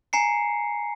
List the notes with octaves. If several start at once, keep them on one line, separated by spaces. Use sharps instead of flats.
G#5 A#5 C7 C#7